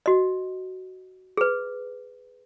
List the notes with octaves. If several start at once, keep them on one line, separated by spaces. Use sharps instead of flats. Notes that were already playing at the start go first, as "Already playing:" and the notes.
F#4 D#5
G#4 B4